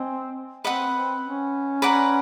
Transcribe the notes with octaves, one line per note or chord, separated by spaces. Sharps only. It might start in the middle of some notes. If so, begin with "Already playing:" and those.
Already playing: C4 D#5 G#5
C4 B4 D#5 F#5 B5
C4
C#4
B4 D5 F#5 A#5